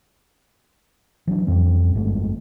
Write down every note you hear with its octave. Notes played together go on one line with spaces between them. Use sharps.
E3 F#3 D4
F2 G3 C4 C#4
G1 G2 G#3 A3